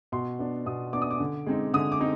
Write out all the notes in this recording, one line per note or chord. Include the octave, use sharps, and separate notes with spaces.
B2 C6
B3 D4
B2 D#6
B3 D4 D6
D#6
D6
D3
G#3 C4 D#4
D3 D#6
D6
C4 D#4